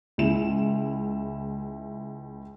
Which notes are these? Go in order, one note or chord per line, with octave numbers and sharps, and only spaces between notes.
C#2 E4 E7